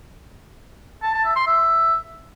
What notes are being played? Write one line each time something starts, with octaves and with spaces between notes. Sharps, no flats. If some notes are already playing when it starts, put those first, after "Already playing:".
A5
A5
E5
C6
E5